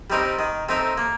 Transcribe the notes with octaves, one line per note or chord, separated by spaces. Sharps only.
G3 C4 D#4 A#4
D#3
A3 C4 D#4 A#4
A#3